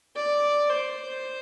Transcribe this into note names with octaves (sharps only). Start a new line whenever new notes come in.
D5
C5